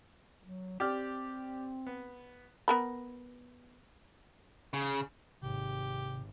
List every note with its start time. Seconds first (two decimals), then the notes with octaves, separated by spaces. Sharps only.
0.42 F#3
0.80 C4 G4 D5 F6
1.87 B3
2.68 B3 A#4 B5
4.74 C#3
5.43 G#1 C3 G4